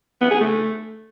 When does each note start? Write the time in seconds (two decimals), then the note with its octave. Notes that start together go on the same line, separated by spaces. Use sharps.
0.21 B3
0.31 G#4
0.41 A3